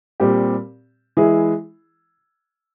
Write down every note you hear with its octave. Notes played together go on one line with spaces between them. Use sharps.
A#2 G3 C4 G4
E3 G#3 E4 G#4